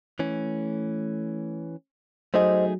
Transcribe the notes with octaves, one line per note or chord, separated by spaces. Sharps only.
E3 A3 C#4
F#3 A3 D#4 G#4 C5 D#5